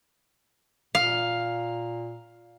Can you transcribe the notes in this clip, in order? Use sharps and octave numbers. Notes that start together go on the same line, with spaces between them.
A#2 F5